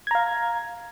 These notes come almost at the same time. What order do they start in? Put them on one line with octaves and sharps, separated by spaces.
G#6 A#5 F5